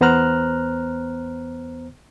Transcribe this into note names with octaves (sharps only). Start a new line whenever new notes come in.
E2 B3 C5 A#5 F6 F#6